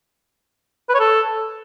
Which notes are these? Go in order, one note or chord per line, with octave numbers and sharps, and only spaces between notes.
B4
C#5
A4